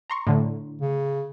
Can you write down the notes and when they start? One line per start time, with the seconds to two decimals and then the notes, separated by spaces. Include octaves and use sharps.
0.10 A#5 C6 C#6
0.27 A2 D3
0.81 C#3